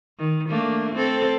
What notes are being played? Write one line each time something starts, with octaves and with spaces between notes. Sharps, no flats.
D#3
A3 A#3 D4
C4 A4